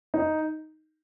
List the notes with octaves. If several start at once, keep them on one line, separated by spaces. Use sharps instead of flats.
D#4